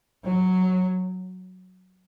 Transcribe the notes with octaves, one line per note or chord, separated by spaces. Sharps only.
F#3